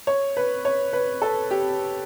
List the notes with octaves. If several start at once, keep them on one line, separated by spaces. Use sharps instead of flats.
C#5
B4
C#5
B4
A4
G4